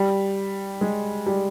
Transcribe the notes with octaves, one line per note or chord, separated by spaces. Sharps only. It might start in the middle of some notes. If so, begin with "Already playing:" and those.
Already playing: G3
G#3
G3